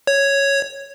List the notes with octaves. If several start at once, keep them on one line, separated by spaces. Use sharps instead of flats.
C#5